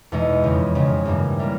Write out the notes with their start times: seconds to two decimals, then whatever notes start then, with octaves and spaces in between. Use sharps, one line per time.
0.12 E2 B2 G#3 B3 D#4
0.43 F2 C#3 F3
0.75 F2 C#3 F3
1.05 G2 E3 G3 A#3
1.39 E3 G3 A#3